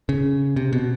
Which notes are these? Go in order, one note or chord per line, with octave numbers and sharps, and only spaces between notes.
C#3
C3
B2